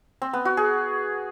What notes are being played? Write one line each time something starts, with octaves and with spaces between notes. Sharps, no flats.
C4
B3
F#4
G#4